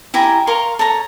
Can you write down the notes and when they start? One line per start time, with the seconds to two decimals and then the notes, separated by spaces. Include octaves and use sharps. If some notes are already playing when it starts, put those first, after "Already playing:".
0.14 E4 G4 G#5 A#5
0.47 A#4 F5 C6 C#6
0.79 A4 C#5 A#5